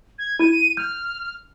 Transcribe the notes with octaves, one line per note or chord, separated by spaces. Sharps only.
G#6
E4 G#6 D#7
F6 G6